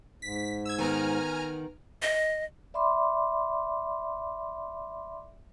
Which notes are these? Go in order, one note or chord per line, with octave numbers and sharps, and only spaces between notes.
G#2 B6
E6 G#6
D#3 B3 G#5 A#5 F6
D#5
D5 E5 B5 C6 D6